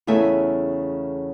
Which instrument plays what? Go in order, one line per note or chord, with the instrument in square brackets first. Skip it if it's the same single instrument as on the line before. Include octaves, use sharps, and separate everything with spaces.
[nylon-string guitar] E2 C#3 A3 E5 G#5